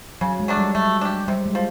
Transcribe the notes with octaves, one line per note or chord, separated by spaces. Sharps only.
C#3 F#3
G#3
F#3 A3 D4
G3
F#3 A3
D4 G4
C3 G3
G#3
F3